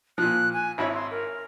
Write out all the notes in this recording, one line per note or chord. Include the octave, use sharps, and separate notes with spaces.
A#2 F3 F#6
G#5
G#1 E4 C#5 B5
C6
A#4